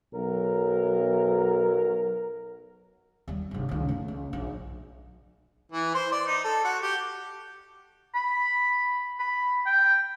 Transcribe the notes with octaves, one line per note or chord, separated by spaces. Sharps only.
B1 F#3 A#4
D#2 G3
G1 C3
C#2 D#3
A3 A#3
C#2
A#1
E3
C5
D5
D#4
A4
F#4
G4
B5
B5
G5